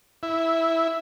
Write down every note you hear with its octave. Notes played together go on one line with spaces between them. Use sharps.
E4